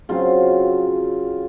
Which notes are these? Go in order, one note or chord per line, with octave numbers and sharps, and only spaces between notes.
C#3 F#3 C4 F4